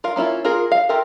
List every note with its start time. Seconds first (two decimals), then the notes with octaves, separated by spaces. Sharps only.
0.04 F4 A#4 F5
0.16 A#3 C#4 E4 F4
0.45 F4 G#4 A#4
0.72 F5
0.89 F4 G4 A4 A#4 E5